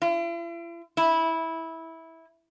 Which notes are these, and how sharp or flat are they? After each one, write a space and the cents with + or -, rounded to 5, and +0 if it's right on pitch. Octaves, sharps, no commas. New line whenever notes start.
E4 +45
E4 -15